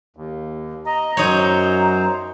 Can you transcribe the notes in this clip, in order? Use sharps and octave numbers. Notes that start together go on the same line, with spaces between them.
D#2
D#5 A#5
F#2 F#3 D#4 C5 C#5